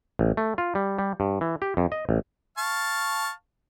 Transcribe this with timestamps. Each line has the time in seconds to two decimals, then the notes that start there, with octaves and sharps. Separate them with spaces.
0.19 A1
0.37 A3
0.58 F4
0.75 G3
0.99 G3
1.20 G2
1.41 E3
1.62 G4
1.77 F2
1.92 D#5
2.09 A1
2.58 F5 A5 C#6